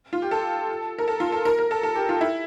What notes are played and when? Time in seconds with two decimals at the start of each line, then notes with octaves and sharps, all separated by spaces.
0.13 F4
0.22 G4
0.31 A4
0.98 A#4
1.08 A4
1.20 F4
1.32 A4
1.45 A#4
1.59 A#4
1.71 A4
1.83 A4
1.95 G4
2.09 F4
2.21 E4